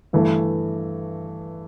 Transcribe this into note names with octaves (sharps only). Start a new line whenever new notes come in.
G2 E3 A3